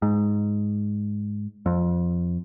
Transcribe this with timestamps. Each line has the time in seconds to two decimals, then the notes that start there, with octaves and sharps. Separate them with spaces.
0.02 G#2
1.66 F2